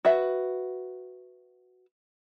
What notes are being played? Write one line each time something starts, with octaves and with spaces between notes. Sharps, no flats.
F#4 B4 E5